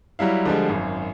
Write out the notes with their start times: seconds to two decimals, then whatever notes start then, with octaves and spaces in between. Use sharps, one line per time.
0.19 F#3 G3 E4 F5
0.45 D3 F3 G3 G#3
0.69 G#1 F#2